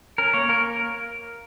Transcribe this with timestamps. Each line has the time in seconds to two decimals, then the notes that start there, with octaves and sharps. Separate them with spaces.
0.18 C#4 A#4
0.33 A#3 C#5
0.49 A#3 A#4